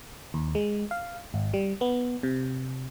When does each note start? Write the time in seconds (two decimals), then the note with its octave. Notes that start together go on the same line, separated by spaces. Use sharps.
0.34 D#2
0.55 G#3
0.91 F5
1.34 G#1
1.54 G3
1.81 B3
2.23 C3